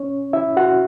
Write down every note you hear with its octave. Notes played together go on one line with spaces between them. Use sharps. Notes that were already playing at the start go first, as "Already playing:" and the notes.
Already playing: C#4 C#5
E4 E5
F#4 F#5